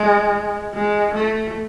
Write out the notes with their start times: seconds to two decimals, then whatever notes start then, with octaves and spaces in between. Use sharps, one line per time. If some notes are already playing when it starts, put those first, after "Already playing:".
Already playing: G#3
0.74 G#3
1.14 A3